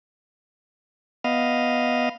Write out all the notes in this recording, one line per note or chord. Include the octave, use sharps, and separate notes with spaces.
B3 D#5 F5